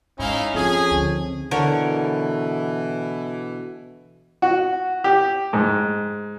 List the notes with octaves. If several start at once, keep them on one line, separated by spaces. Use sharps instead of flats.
G#2 C#4 D#4 E4 F5
F2 F3 G#4
D2 D#3
B2 D3 E3 A#4 C#5
F#4
G4
G#2